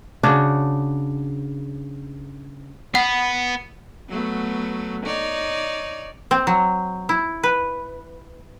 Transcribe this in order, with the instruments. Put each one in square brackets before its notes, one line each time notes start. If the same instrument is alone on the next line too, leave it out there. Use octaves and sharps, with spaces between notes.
[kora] C#3 D4 F#4
[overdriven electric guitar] B3 [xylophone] F#5
[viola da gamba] F#3 A3 B3
D#4 C#5 D5
[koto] C4
F#3
E4
B4